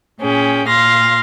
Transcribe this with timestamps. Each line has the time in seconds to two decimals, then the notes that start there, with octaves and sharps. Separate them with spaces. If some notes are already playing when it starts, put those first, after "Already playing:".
0.21 A#2 C#4 G#4 G5
0.66 A#2 F5 C6 A#6